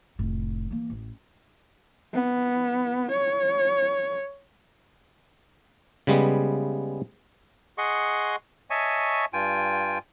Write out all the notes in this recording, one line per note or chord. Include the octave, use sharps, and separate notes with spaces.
F1 A2
E3 A#3
A1
B3
C#5
C#3 G3 G#3 B3
G#4 D#5 F#5 C6 C#6
C#5 D#5 E5 G#5 A5 C#6
G2 F4 G5 G#5